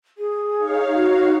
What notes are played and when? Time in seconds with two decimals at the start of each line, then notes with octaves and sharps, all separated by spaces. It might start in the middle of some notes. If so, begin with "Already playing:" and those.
0.18 G#4
0.57 D#4 C#5 F5
0.94 F#4